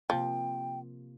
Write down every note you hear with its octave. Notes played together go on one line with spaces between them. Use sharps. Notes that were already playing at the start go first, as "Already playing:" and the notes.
C3 F3 A#3 F4 G5